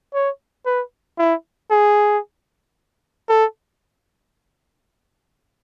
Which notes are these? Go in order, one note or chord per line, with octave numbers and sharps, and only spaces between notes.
C#5
B4
E4
G#4
A4